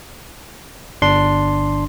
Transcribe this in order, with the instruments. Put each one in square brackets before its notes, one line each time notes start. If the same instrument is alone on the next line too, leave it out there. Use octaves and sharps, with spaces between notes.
[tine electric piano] G1 D4 C6